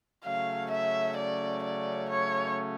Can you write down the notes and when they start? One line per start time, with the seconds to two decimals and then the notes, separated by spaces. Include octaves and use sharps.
0.25 C#3 F#3 A3 C#4 F5
0.71 E5
1.17 D5
1.64 D5
2.09 C#5